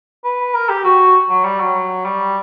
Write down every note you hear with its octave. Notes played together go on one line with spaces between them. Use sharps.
B4
A#4
G4
F#4
F#3
G3
F#3
G3